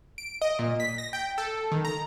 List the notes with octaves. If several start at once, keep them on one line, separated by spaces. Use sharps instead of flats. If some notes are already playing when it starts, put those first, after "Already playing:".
D7
D#5
A#2
B6
A#6
G5
A4
D#3
A#5